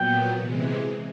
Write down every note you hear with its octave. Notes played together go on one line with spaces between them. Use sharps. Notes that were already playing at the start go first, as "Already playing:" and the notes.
Already playing: A#2 F#3 B3 G5
C3 E3 G#3